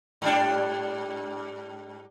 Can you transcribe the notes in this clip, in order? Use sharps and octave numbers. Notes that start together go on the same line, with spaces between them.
G#2 G3 D4